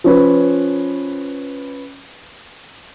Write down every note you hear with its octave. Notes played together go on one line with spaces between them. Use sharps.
F3 C#4 B4